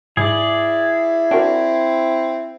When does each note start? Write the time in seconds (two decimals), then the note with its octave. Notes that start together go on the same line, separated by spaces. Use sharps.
0.17 G#2 E4 G#4 D5
1.31 C4 D4 F#4 A#4